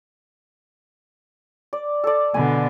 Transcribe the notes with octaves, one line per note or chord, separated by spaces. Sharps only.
D5
A4 D5
B2 D3 G#5